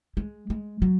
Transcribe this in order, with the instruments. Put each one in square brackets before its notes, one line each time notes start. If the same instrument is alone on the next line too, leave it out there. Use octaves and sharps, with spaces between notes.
[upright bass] G#3
G#3
F#3